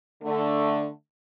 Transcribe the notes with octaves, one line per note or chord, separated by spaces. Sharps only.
D3 A3